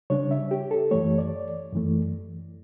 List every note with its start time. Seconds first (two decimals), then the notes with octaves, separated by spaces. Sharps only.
0.10 C#3 G3 D4 C#5
0.31 E5
0.51 G4
0.71 A4
0.91 F#2 E3 A3 C#5
1.18 D5
1.72 F#2 E3 A3